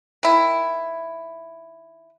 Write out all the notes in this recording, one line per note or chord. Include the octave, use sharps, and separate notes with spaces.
D#3 E4